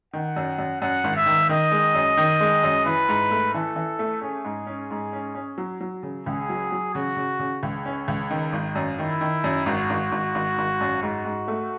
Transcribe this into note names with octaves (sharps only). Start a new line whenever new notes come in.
D#3 F#5
F#2
F#2
F#2 F#5
G#1
E5
D#3
D#3 D#5
G#3
F#2
D#3
G#3
F#2
E3 B4
G#2
A3
E3 A4
E3
A3
C#4 G#4
G#2
C#4
G#2
C#4
C#4
F#3
F#3
C#3
C#2 G#4
F#3
F#3
C#3 F#4
C#3
C#3
C#2
C#4
C#2
D#3
G#1
F#2
D#3 E4
D#3
F#2
G#1 F#4
G#1
G#1
G#1
G#1
F#2
G#2 F#4
G#2
A3